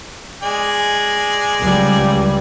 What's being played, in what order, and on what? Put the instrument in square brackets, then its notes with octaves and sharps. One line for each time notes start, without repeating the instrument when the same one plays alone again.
[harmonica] G#3 D5 G#5
[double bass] C#2 G3